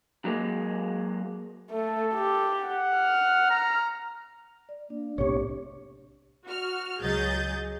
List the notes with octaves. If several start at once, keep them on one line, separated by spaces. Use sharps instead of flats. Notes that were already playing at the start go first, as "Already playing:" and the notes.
F#3 G#3 A#3
A3 A4
G4
F#5
F6
A#5
D5
A#3 D4
B1 A2 C3 G4 C#5
F#4 F6
C#2 F#3 G#4 D#5 G6 A6